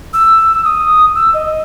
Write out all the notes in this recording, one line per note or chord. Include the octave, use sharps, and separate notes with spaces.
E6
D#6
E6
D#5